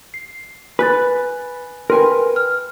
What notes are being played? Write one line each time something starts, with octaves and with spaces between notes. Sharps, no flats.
C7
B4 G#5 F#6 A6
A#4 B4 G5 G#5 C6
F6